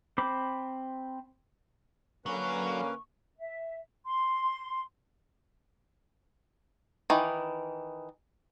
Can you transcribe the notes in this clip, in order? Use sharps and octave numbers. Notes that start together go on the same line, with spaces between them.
C4 C5 B5 D6
D3 F#3 A#3 C#4 B4 C#6
E5
C6
D#3 E3